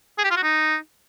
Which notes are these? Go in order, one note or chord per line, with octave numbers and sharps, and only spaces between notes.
G#4
G4
F4
F#4
D#4